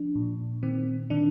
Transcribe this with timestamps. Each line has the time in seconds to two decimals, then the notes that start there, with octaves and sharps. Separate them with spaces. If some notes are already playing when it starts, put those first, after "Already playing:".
Already playing: F3 D4
0.15 A#2
0.63 D#3 C4
1.10 D#3 D4